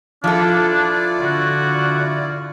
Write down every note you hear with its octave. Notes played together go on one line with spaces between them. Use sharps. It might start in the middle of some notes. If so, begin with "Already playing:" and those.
F3 D4 E4 F4 A4 D5
D3 F#4